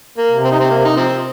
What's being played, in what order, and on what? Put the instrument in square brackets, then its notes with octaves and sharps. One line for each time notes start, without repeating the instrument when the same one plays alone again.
[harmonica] A#3
[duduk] C3
[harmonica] C4
D#4
C4
A#3
D#4
F3 C4